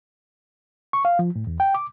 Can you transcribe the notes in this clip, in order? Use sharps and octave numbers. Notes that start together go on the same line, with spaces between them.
C#6
F5
F3
A2
E2
G5
D6